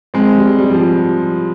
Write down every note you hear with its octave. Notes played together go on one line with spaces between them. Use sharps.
G#3 C4
G3
G3
G3
F3